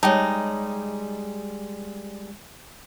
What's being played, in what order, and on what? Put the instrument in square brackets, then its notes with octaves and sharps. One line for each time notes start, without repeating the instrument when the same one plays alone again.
[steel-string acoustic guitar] G3 G#3 [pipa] D#4 [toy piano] C#5 G5 A5